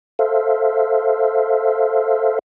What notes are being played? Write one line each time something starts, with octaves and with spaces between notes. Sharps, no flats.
A4 C5 E5 F5